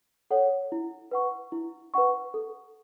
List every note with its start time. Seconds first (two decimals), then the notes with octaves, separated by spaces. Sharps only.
0.31 A4 C#5 F#5
0.72 E4
1.11 B4 F#5 C#6
1.52 E4
1.94 B4 F#5 C#6
2.34 A4